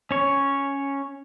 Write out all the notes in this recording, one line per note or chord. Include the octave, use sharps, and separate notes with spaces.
C#4 C#5